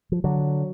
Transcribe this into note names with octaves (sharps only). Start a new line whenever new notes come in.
F3
D3 F#3